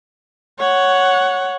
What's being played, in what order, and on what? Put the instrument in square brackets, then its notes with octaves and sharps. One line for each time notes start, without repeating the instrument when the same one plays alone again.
[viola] C#5 F#5